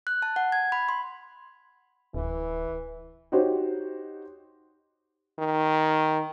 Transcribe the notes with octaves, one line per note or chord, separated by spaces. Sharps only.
F#6
A5
F#5
G#6
B5
C6
D1 E3
D#4 F#4 G4 C5 C#5
D#3